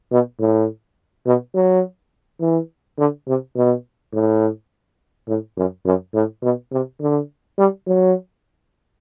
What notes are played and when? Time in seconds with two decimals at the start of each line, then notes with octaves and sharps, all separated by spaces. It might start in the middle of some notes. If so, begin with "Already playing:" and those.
0.12 B2
0.40 A2
1.26 B2
1.55 F#3
2.41 E3
2.98 D3
3.28 C3
3.56 B2
4.13 A2
5.28 A2
5.57 F#2
5.85 F#2
6.14 A2
6.43 B2
6.72 C3
7.01 D3
7.58 G3
7.87 F#3